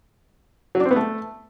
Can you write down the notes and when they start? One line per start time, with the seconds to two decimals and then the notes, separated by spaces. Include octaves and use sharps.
0.75 F#3
0.80 D4
0.85 C4
0.91 B3
0.96 A3